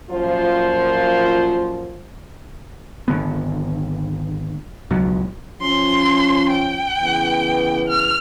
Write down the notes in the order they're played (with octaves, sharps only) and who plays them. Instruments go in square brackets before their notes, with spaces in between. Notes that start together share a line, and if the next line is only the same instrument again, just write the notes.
[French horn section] F#2 A#2 F3 F4 C5
[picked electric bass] G#1 D3 B3
C#2 B2 F#3
[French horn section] F3 C#4 [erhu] C6
[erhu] G5
[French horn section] C#3 E3 B3
[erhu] F6